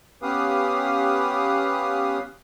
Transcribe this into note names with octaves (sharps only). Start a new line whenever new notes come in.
B3 C#4 G4 B4 F5 D#6